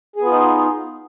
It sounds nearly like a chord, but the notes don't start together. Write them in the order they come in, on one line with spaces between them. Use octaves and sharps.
G#4 B3 F4 D#4